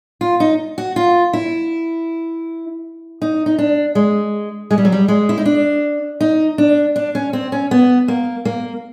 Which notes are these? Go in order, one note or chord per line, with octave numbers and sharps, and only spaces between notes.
F4
D#4
F#4
F4
E4
D#4
D#4
D4
G#3
G#3
G3
F#3
G3
G#3
E4
D#4
D4
D#4
D4
D4
C#4
C4
C#4
B3
A#3
A#3